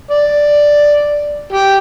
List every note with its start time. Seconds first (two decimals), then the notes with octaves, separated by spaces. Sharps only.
0.11 D5
1.53 G4